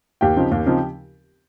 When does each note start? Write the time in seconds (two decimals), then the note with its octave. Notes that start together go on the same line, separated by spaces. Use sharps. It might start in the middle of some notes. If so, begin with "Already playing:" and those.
0.21 D#2 G4 G5
0.36 C#3 F3 C4 D#4
0.51 D#2
0.66 C#3 F3 C4 D#4